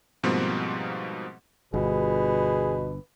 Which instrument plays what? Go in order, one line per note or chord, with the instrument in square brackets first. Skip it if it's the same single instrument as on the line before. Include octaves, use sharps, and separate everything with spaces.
[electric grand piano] G#2 B2 F3 G3 A#3 C4
[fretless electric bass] G1 [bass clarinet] B2 [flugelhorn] G#4 [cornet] B4